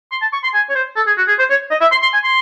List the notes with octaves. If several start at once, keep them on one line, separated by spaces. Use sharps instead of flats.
C6
A5
C#6
C6
G#5
C#5
C5
A4
G#4
F#4
G#4
C5
C#5
D#5
E5
C6
C6
G#5
C6